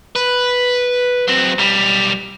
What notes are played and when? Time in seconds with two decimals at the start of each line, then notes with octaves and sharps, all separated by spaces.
0.15 B4
1.28 F#3 C4
1.58 B1 G3